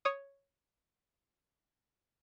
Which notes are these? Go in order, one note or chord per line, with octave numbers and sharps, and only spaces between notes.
C#5 D#6